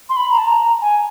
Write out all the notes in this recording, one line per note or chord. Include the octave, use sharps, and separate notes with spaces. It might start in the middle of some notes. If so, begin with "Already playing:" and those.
C6
B5
A#5
A5
A#5
G#5